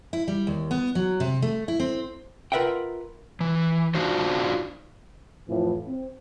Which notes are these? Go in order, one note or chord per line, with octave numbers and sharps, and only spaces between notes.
E4
G3
D#2
B3
F#3
C3
A3
E4
C4
F4 A#4 B4 E5 F#5 G5
E3
D4 D#4 F4 F#4 C5
F2 A2 E3 F3
C4